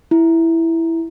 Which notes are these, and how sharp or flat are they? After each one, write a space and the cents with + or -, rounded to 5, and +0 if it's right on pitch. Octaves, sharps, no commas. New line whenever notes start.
E4 +0